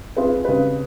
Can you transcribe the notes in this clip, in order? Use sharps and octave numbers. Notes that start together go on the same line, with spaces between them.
C4 F4 G#4 B4
C#3 C4 G4 B4